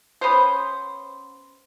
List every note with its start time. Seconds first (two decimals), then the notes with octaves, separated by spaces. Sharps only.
0.21 B3 C#4 C5